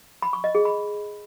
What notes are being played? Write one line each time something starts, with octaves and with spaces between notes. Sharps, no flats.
B5
C#6
D#5
G#4
B5